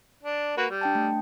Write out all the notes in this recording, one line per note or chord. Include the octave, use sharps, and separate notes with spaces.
D4
A#3 F#4 B4
G3
D4 G5 A5
A3